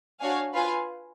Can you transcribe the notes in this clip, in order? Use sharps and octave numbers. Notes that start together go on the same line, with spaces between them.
D4 F#4 C#5 F5 G#5
F4 B4 F5 G#5